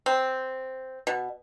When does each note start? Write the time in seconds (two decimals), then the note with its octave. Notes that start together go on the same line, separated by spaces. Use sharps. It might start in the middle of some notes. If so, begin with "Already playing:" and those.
0.06 C4
1.07 B2